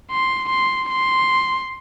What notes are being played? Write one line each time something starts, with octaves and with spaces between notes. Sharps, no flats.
C6
C6
C6